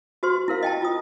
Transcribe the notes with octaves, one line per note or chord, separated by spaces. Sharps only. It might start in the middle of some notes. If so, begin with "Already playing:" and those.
F#4 G4 C5 C6
E4 A#4 F5
D#5 G5 A5
F4 D#6